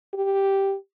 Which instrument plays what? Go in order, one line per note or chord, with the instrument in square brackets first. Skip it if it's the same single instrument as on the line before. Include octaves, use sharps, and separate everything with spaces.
[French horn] G4